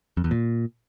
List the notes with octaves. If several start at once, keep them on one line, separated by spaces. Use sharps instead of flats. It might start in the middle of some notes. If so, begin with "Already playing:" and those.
F2
E2
A#2